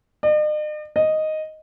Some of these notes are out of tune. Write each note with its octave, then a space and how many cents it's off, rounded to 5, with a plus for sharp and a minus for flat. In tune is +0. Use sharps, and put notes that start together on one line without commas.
D#5 -45
D#5 +0